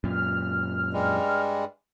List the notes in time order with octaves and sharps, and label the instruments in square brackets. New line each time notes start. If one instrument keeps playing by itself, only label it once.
[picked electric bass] F#2 A#2 [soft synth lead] F6
[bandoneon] G2 G3 G#3